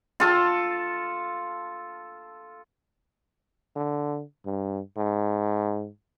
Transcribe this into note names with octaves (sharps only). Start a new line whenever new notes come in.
F4 A4
D3
G2
G#2